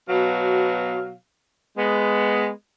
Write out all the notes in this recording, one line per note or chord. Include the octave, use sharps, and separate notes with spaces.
B2 F#3 B3 F5
G#3 B3